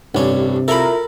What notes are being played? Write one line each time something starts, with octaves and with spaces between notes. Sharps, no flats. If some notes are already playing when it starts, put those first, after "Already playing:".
A1 G2 C3 C#4 D4
E4 F4 A4 A#4 B5